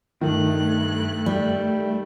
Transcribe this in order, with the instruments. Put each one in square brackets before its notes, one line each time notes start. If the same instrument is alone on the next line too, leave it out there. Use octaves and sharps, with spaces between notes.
[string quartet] G2 F#6 [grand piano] D#3 [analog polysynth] A3
[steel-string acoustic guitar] G3